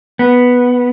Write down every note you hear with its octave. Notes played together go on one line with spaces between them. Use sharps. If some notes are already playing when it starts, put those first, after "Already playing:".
B3